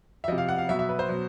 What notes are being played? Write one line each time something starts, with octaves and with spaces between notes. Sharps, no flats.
E5
C3 F3 D#5
F5
F#5
F5
B2 F#3 E5
E5
B4
C5
B2 F#3